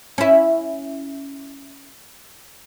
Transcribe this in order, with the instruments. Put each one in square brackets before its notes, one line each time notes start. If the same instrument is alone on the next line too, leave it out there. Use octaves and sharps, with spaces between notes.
[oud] C#4 E4